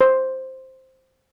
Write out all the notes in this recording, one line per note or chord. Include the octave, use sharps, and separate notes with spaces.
C5